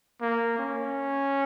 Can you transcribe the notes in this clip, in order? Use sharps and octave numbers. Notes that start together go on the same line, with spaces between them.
A#3
C#4